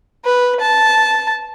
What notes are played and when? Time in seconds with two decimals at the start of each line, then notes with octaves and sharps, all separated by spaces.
0.25 B4
0.60 A5